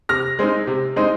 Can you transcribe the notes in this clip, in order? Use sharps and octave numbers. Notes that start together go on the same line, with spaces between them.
C3 F6 A#6
G#3 C4 D#4
C3
G#3 C4 D#4